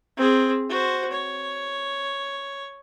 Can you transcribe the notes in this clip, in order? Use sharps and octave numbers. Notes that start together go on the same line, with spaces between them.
C4 G#4
F#4 C5
C#5